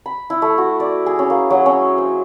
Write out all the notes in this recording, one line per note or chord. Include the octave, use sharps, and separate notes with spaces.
B5
E4
A3
F#4
D5
G#4
C#4
A#3
F#3
C#4
C5